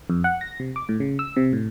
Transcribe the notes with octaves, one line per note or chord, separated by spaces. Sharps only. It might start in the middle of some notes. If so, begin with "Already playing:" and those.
F2
F#5
A#6
C3
D6
A2
C#3
E6
C3
A2